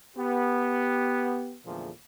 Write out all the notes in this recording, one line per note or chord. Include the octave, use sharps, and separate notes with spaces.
B3 G4
E2 A#2 D3 F3 A3 G#4